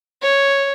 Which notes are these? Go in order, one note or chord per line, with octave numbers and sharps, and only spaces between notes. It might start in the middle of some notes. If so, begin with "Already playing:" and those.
C#5